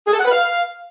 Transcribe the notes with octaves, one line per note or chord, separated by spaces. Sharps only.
G#4
A4
F#5
B4
F5